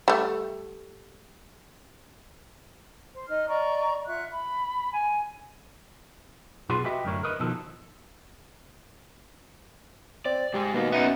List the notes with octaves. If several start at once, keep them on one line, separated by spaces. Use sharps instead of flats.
G3 A3
C5
D#4 D#5 F6
D5 D#5 A#5 C#6
F4 E5 F#5 F#6
B5
G#5
B1 B3 F4 G#4 C6
F#4 G4 B4 D#5 E5
F#2 A2 D3 A#4 C#5
A#4 B4 D#5
B2 D#3 F3 A4
C4 D5
G#2 G#3 G4 G#4
B2 A#3 D#4 F5
B3 C#4 D#4 E5